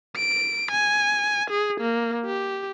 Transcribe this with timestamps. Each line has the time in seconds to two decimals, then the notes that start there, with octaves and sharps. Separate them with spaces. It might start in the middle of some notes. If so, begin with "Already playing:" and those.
0.16 D7
0.72 G#5
1.50 G#4
1.81 A#3
2.26 G4